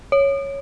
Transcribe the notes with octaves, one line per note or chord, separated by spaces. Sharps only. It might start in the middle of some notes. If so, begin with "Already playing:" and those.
C#5